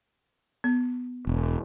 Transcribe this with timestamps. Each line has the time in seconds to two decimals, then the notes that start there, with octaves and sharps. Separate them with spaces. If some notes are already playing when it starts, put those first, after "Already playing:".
0.64 B3
1.27 E1